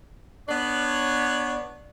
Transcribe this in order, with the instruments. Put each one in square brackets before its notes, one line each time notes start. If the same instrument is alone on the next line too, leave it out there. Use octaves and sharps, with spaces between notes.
[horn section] B3 D4 C#5